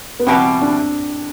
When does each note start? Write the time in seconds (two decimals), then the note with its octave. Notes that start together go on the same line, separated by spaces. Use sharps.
0.19 B3
0.27 E2 B2 G3 C4
0.62 D4